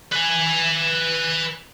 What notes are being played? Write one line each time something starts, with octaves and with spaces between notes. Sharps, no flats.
B4 G#5